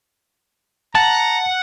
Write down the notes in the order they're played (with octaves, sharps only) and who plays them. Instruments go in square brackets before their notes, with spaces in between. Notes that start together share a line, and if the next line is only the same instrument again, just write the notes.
[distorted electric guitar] F#5 [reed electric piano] A5 [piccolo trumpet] A#5